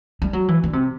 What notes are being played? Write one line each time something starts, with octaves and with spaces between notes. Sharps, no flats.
G3
F#3
E3
D3
C3